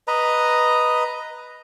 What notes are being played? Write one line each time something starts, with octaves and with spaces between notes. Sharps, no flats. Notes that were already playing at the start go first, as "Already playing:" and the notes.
B4 D#5 A#5